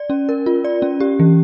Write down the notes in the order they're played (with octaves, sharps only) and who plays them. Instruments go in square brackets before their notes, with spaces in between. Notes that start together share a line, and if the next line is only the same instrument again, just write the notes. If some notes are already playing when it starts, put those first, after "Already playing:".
Already playing: [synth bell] D5
C#4
A#4
F4
D5
C#4
G4
E3